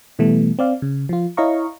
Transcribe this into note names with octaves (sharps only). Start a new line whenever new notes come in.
B2 E3 G3 A3 B3
C4 D5 F5
C#3
F3 F4
E4 C#5 D#5 F5 A#5 C#6